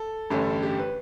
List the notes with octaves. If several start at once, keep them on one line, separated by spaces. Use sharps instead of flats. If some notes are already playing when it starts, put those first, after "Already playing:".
Already playing: A4
A1 G2 D3 A3 C#4
G4
B4